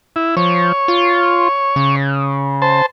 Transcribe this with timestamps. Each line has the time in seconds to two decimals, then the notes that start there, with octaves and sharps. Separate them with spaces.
0.16 E4
0.37 F3 C#5
0.88 F4
1.76 C#3
2.62 C5 A5